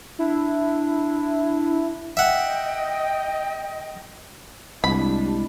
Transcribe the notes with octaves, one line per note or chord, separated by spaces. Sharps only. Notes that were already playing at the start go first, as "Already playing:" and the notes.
D4 E4
D#5 E5 F#5 G5
C2 G3 G#3 D4 E4 B5